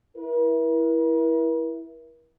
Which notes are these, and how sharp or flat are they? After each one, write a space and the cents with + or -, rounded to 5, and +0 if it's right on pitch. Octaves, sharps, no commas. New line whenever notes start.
E4 +0 A#4 +45